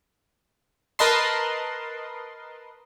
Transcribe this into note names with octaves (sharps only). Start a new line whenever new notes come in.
A#4 B4 D#5 A5 C6